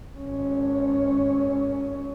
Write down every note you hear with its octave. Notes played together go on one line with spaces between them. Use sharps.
G#1 C#4